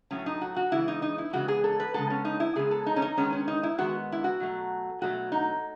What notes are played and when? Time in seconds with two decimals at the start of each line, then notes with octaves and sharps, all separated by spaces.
0.11 A2 F#3 A3 C#4
0.26 D#4
0.41 F#4
0.56 F#4
0.72 C#3 E3 G#3 B3 E4
0.88 D#4
1.02 D#4
1.18 E4
1.33 C#3 E3 G#3 B3 F#4
1.48 G#4
1.64 A4
1.80 B4
1.94 C#3 G#3 B3 A4
2.10 C#4
2.25 D#4
2.40 E4
2.55 C#3 G#3 B3 G#4
2.71 A4
2.86 D#4
2.96 C#4
3.02 D#4
3.17 D#3 G#3 B3 C#4
3.32 C#4
3.48 D#4
3.63 E4
3.78 D#3 G#3 B3 F#4
4.12 E4
4.24 F#4
4.40 B2 F#3 A3
5.02 B2 F#3 A3 F#4
5.32 D#4